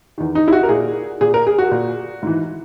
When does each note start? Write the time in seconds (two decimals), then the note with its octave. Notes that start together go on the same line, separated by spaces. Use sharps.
0.18 E2 D#3
0.35 D#4
0.48 E4
0.53 F#4
0.63 A#4
0.69 A#2 G#4
1.21 A#2 G#4
1.34 A#4
1.47 G#4
1.58 F#4
1.71 A#2
2.23 G#2 E3